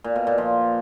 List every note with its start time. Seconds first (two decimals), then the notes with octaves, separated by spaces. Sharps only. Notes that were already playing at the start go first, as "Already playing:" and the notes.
0.04 A#2
0.16 B2
0.27 A#2
0.38 F3